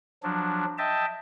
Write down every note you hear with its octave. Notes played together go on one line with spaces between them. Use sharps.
F3 F#3 D4
D#5 E5 G5 A5